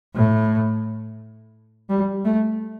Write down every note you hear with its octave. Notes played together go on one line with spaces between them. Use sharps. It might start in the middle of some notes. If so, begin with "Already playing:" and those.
A2
G3
A3